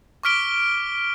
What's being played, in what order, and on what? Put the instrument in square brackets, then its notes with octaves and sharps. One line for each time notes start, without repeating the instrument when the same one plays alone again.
[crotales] C#6 D6 F6 B6 D7 G7